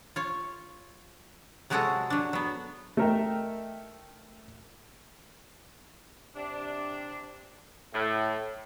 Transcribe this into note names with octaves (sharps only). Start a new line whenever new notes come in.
F4 C#5
C3 F#3 G#3 F#4 G#4 A4
F#3 D4
F#3 B3
A3 D#4 A#4 E5 G5
C3 D4
A2